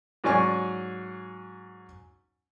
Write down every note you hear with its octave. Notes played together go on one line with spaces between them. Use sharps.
G#2 F#3 C#4 D5 G#5 C#6